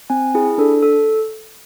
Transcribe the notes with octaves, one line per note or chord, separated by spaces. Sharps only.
C4 G#5
E4 G#4
D4 A4
A4